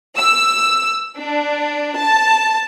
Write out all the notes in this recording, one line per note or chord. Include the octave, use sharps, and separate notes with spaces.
E6
D4
A5